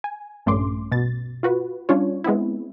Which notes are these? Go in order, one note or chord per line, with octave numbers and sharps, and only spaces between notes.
G#5
A#1 G2 A3 C#4 C6 D6
B2 A6
F4 F#4 B4
G3 C#4 D4 F4 C#5
G#3 B3 C4 E4